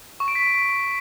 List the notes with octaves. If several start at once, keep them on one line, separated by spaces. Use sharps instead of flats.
C#6
D7
B6